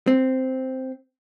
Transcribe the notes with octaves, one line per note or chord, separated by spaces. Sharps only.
C4